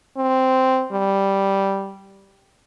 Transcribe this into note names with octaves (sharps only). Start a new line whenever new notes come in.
C4
G3